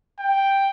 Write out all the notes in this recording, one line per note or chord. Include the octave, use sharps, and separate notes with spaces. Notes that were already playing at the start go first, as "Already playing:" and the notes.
G5